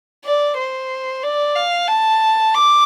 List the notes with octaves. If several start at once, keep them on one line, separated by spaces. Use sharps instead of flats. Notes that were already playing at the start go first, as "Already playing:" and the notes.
D5
C5
D5
F5
A5
D6